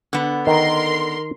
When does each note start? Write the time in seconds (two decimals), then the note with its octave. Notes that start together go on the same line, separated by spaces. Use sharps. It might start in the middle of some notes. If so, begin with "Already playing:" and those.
0.13 D3 B3
0.47 D#3 A#4 C6